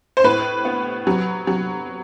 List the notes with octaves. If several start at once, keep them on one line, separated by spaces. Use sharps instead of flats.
C5
A2 B4
B3
F#3
F#3